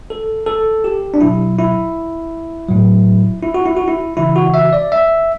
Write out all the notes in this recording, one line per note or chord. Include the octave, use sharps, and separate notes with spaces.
A4
A4
G4
D4
B2 F#3 E4
E4
A2 F#3
E4
F#4
E4
F#4
E4
C#3 E3 E4
F#4
E5
D5
E5